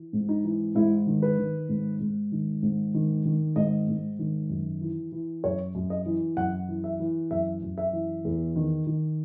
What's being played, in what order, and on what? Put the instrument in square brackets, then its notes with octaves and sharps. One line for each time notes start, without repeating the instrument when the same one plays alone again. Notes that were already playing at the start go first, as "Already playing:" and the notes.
Already playing: [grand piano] E3
G#2
D#4
E3
G#2 E4
D#3
B4
D#3
G#2
G#2
D#3
G#2
D#3
D#3
G#2 D#5
G#2
D#3
F#2
E3
E3
F#2 C#5
F#2
D#5
E3
F#2 F#5
E3
E5
E3
F#2 E5
F#2
E5
E3
E2
D#3
D#3